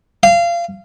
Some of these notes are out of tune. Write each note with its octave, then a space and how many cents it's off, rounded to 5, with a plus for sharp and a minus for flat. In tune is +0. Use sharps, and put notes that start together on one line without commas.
F5 -25